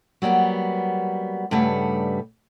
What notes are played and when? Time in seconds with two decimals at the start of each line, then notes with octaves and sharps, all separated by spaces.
0.22 F#3 G3 A#3 B3
1.51 G2 C#3 G3 A3 B4 F#5